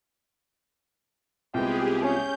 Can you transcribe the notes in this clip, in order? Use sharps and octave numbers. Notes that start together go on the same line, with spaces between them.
C2 G#3 B3 C4 F4 G4 G#4 G5
C#4 G6